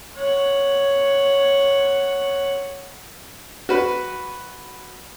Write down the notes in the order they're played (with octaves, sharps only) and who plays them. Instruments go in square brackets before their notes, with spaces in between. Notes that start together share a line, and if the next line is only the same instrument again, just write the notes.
[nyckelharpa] C#5 F#5
[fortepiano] F#4 B4